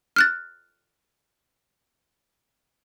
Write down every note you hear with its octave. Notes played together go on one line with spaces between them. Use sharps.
F6 F#6 A6